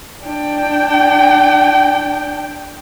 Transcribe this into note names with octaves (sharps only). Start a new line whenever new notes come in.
D4 G5